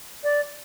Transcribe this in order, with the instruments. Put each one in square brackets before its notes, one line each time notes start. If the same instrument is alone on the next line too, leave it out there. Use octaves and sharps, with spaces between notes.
[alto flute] D5